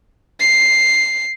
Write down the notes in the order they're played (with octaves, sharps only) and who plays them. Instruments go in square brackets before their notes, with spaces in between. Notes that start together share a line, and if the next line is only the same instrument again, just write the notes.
[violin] C7